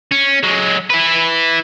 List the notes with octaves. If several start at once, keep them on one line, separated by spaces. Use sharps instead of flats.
C#4
F#3 G#3
E4 B4